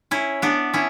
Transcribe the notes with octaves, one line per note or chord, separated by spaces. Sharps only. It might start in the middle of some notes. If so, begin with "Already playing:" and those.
C#4 E4
B3 D4
C#4 E4